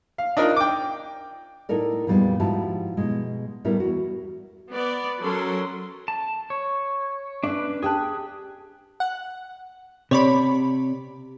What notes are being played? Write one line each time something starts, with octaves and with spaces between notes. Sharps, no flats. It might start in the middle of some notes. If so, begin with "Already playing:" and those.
F5
D4 D#4 F4 A#4
G5 D6
A2 D#4 E4 A4 A#4 D5
F2 A#2 G3 G#3 B3
G#2 F3 E4 F#4 G4 A5
B2 G#3
A2 G3 B3 E4 A#4
E2 F#4
B3 D5
F#3 C#4 A4 A#4 C6
A5
C#5
C#4 D4 B4 E5
G4 G#4 G5 A5 F#6
F#5
C3 C#5 D5 B5